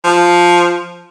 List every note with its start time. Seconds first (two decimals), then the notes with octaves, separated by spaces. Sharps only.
0.04 F3